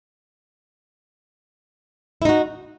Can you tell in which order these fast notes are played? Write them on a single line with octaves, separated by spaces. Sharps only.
E4 D#4 F#4